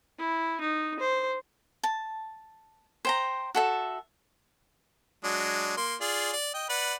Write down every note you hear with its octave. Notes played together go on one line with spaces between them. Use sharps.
E4
D#4
C5
A5
C5 G5 A#5
F#4 A4 E5
F#3 G#3 D4
A#3 C6
F4 G#4 D5
D5
D#5 G5
B4 D5 F#5